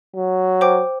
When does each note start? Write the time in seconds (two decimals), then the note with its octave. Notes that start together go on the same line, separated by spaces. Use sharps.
0.15 F#3
0.61 C5 G5 D6